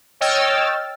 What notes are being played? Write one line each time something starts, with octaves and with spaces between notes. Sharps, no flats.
C#5 D#5 G5 E6 F6 A6